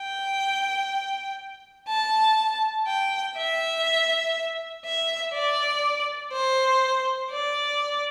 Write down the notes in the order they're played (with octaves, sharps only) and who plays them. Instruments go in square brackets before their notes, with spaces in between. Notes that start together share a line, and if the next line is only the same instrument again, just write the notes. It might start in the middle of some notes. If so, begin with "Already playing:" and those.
Already playing: [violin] G5
A5
G5
E5
E5
D5
C5
D5